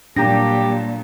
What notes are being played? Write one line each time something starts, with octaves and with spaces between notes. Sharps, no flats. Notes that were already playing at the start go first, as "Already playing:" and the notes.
A#2 F#3 G3 D4 G4 A#5 A#6